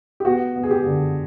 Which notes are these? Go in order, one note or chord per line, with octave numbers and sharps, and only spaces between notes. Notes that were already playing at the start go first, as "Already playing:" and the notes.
G4
B3 F#4
B3
G#4
G4
D3